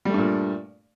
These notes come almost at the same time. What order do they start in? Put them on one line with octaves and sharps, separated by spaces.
G3 A3 G2 A#2